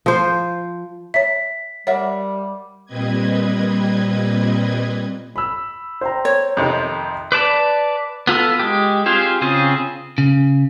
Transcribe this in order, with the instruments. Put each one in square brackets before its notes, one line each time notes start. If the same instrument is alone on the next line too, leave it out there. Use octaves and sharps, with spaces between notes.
[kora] F3 C5
[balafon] C#5 E5 [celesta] B6
[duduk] G3 [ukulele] A#4 E5 F#5 [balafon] C#5
[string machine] A#2 G3 C4 B4 D#5 G#6
[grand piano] B5 E6
C5 G5 A#5
[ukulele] C#5
[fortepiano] F2 C3 D#3
[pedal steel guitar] B4 D5 A5
B3 F4 A4 B4
G#3 G4
C4 F4 G4 G#4 C5
C#3 C4 C#4 F4 G#4
[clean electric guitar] C#3